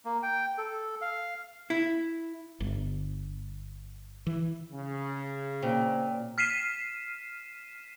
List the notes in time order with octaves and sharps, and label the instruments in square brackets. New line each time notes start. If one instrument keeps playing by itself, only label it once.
[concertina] A#3
G5
A4
F5
[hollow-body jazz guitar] E4
[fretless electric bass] G1
E3
[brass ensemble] C#3
[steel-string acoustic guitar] A#2 [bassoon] C4
[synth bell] F6 B6 C7 D#7 E7